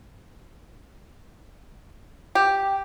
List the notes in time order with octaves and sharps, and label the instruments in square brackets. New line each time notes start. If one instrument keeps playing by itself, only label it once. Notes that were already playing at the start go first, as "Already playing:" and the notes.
[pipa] G4